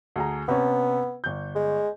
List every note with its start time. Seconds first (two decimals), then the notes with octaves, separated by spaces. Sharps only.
0.16 D2 G#4 A#5
0.48 C3 B3 C#4
1.24 G1 G6
1.55 G#3